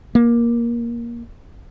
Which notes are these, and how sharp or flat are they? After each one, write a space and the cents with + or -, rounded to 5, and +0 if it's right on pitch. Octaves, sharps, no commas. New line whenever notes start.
A#3 +15